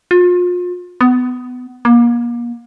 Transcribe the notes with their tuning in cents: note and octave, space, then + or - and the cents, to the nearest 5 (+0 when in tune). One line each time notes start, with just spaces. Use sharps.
F4 +35
B3 +20
A#3 +35